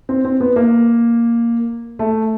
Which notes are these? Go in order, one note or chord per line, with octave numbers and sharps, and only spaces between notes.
C4
C4
B3
A#3
A3